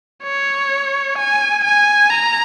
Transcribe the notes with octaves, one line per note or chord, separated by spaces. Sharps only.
C#5
G#5
G#5
A#5